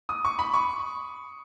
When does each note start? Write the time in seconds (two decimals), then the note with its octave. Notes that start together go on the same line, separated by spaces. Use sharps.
0.09 D#6
0.25 C#6
0.39 B5
0.54 C#6